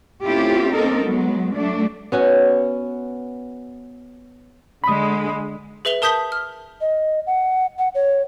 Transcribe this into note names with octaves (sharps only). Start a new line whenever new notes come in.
A3 C4 C#4 E4 F4 G4
A#3 C4 C#4 D#4 A4 A#4
F#3 G#3 B3
F#3 A3 D4
B3 C#4 F#4
D3 G#3 B5 D#6
G#4 B4 E5 F7 G7
A#4 A5 D#6 G6 B6 G7
F6
D#5
F#5
F#5
C#5